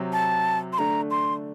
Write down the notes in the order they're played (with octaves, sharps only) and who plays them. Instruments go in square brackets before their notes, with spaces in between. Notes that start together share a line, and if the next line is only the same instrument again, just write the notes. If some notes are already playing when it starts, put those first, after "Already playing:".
Already playing: [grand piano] C3 F#3 C4
[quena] A5
C6
[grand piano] D3 A3 D4 [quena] A#5
[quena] C6